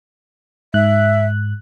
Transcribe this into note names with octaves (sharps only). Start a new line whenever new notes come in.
G#2 E5 F#6